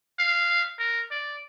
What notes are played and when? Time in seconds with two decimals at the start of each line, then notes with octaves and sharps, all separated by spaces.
0.19 F5
0.79 A#4
1.11 D5